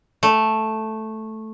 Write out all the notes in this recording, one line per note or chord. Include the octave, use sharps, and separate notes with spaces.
A3